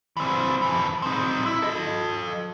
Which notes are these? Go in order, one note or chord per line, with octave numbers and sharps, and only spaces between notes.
E3 C4
F2 E3
C4 D#4
E4
A4 D#5